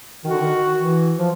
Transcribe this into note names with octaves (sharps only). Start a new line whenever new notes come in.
D#3 F#4
D3
D#3
E3
F3